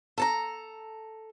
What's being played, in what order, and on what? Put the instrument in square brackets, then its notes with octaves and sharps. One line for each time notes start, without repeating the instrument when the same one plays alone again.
[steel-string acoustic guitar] A4 A5 A#5